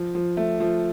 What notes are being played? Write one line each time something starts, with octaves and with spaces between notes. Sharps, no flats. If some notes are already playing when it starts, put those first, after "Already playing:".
Already playing: F3
F3
A3
F3